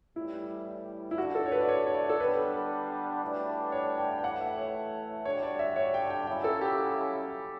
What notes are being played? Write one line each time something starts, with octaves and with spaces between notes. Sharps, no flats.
A2 E3 G3 E4
E4
D3 A3 D4 F#4
A4
C#5
B4
D5
C#5
C#5
D5
A4
D3 G3 B3 D4 B4
A2 E3 G3 D4 F#4
C#5
G5
G5
A2 E3 A3 F#5
E5
C#5
D3 G3 D4 F#4 C#5
D5
E5
C#5
G5
G5
C#3 F#3 C#4 E4 G5
A4
G4